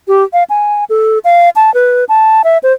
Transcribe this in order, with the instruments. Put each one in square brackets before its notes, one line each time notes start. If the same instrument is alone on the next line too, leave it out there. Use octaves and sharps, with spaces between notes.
[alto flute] G4
F5
G#5
A4
F5
A5
B4
A5
E5
C5